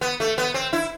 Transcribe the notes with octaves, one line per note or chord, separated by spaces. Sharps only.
B3
A3
B3
C4
E4